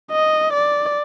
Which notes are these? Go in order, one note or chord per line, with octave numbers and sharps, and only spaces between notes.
D#5
D5